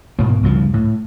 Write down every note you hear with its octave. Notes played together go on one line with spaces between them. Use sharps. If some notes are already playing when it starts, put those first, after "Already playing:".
G#2 B2 A#3
C#2 G2 F3
A2